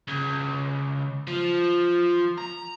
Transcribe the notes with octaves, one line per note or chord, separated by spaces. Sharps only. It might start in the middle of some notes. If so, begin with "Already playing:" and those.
C#2
F3
A#5